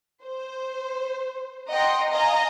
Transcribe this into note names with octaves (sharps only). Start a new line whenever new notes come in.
C5
D#5 F#5 G5 A#5 C6
D#5 F5 G#5 A#5